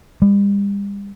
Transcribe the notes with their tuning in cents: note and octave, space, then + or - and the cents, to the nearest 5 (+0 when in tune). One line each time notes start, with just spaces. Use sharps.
G3 +40